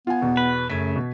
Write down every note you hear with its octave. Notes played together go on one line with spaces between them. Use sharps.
B3 F4 G#5
E2 B2
B4
F#2 C#3 A3 G#6 B6
B2